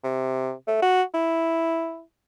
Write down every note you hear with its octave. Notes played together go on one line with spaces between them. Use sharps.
C3
A3
F#4
E4